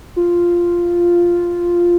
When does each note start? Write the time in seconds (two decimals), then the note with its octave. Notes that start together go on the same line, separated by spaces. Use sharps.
0.16 F4